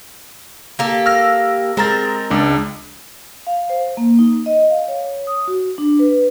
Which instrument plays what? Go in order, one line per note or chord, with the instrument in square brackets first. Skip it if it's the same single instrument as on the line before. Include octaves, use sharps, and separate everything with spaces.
[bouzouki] A#3 G4 A4
[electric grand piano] E6 F6 A#6
[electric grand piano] G#3 A#5 A6 [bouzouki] C4 A#4
[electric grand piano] C#2 D4
[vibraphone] F5
C5
A#3
D#4
D#5
F5
C#5
D#6
F#4
D4
B4